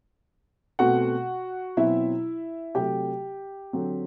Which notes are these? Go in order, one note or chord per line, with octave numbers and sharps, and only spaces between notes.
B2 A3 C4 F#4 F#5
B2 F#3 C4 E4 E5
C3 F#3 A3 G4 G5
D3 F#3 C4